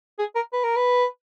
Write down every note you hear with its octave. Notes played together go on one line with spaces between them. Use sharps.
G#4
A#4
B4
A#4
B4